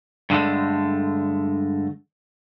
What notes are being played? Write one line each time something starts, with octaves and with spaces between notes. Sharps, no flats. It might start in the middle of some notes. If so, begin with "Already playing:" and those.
G2 D3 G#3 A3